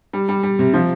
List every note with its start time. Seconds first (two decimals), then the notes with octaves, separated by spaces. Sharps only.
0.13 G3
0.29 G3
0.43 G3
0.59 C3
0.74 F3